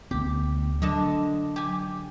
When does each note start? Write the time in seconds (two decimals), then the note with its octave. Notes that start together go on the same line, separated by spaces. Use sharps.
0.11 D2 B3 G4
0.82 D3 F#3 D#5 A5
1.56 G4 G#5